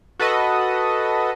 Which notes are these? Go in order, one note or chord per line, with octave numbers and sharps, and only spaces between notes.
F#4 A4 B4 D#5